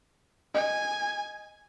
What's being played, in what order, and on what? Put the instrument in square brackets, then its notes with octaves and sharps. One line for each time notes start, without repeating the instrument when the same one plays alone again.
[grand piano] D#5 [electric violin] G#5